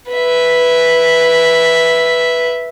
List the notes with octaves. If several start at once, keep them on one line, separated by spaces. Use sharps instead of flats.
B4 E5